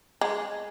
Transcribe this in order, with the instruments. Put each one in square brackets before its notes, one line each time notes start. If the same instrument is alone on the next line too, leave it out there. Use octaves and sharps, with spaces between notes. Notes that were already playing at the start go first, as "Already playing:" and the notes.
[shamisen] G#3